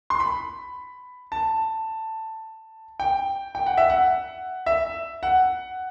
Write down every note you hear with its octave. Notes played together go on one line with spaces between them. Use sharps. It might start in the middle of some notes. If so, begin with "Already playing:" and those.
C6
B5
A5
G5
G5
F#5
E5
F#5
E5
F#5